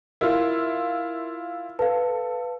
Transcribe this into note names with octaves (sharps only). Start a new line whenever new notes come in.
E4 F4 A#4
A4 B4 F5